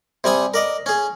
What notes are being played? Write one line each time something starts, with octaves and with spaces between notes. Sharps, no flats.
C3 G3 G#5 D#6
A#4 D5 D#5
C#4 G#4